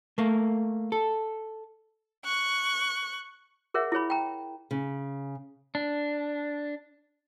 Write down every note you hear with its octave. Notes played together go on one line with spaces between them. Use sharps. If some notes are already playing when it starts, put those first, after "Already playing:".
A3 A#3
A4
C#6 F#6
G#4 A#4 C#5 E5 F#5
E4 G#4 C#5 B5
G5 A#5
C#3
D4